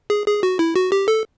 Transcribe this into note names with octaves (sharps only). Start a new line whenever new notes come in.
G#4
G#4
F#4
E4
F#4
G4
A4